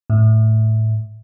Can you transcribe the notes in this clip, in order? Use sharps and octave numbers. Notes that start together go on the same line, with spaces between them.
A2